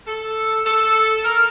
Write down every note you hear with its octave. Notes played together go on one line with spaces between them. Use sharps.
A4
A4
A#4